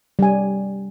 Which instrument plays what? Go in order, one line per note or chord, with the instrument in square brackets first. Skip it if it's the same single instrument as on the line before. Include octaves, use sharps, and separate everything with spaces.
[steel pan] G3 G#5